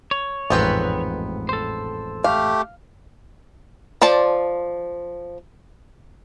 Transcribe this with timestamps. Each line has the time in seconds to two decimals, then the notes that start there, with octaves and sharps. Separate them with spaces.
0.11 C#5
0.50 A1 F2 G#2 B3 C4 B4
1.49 A4 C5
2.24 A3 G4 F5
4.02 F3 C5 D5 A5